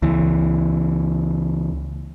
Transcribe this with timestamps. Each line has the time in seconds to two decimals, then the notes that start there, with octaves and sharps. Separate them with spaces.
0.02 C#2 E3